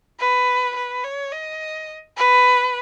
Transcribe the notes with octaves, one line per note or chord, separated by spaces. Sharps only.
B4
B4
C#5
D#5
B4